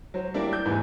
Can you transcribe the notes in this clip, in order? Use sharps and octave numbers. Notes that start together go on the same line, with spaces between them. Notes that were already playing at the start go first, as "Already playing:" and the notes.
F#3 C5
G3 A#3 D4 E4
G6
A1 E2 G#2 E3 B4 G#5